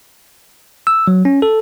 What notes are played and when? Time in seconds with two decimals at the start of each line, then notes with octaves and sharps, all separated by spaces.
0.87 E6
1.08 F#3
1.25 C#4
1.42 A4